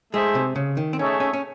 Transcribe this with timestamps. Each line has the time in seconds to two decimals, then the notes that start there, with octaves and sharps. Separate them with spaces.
0.14 G#3 A3 D#4 G#4 C5 E5
0.35 C3
0.56 C#3
0.77 D#3
0.93 C4
0.99 A3 C#4 D#4 G#4 C#5 E5
1.20 C#4
1.33 C#4